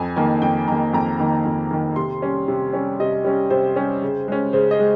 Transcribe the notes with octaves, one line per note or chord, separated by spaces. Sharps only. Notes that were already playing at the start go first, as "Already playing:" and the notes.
Already playing: F2 G#5
D#3 A#3 G#5
F2 G5
D#3 A#3 A#5
F2 A#5
D#3 A#3
F2
D#3 A#3
C3 C6
G3 C#4
C3
G3 C#4
C3 D#5
G3 C#4
C3 C5
G3 C#4
C#3
G#3 C#4
C#3 C5
D#5
G#3